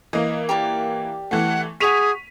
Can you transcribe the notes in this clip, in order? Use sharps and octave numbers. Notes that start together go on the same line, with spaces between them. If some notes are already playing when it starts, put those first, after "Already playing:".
E3 A#3 D#5
G4 A#4 D5
E3 A3 F#5
F#4 G#4 C#6 B6 D#7 F7